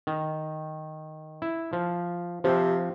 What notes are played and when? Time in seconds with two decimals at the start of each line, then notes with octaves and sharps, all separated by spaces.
0.07 D#3
1.42 E4
1.73 F3
2.44 C3 F3 C4